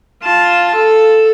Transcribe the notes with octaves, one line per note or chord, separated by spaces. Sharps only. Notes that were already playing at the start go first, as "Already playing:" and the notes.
F4 A5
A4